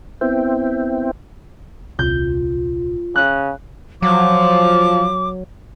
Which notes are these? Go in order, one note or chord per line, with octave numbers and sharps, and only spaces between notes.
B3 C4 E4 C5 E5 G5
D#1 C2 F4 G6
C#3 F#6
F3 F#3 D6